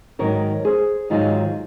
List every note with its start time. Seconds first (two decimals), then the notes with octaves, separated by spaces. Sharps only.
0.19 G#2 D#3 F#3 A#4 C#5
0.65 G#4 C5
1.10 G#2 D#3 F#3 F4 G#4